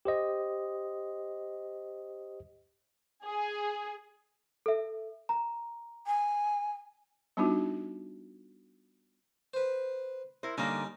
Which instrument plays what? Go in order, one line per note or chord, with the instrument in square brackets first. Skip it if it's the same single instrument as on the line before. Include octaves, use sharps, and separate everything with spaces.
[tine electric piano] G4 C5 D#5
[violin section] G#4
[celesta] A4 E5
A#5
[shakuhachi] G#5
[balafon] G3 B3 D4 D#4 F4 F#4
[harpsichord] B4 C5
[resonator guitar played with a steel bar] E4 A#4 C5
[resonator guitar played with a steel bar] D3 A#3 [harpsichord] G3 C#4 D#4